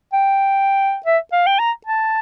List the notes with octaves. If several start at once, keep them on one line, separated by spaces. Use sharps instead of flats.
G5
E5
F5
G5
A#5
A5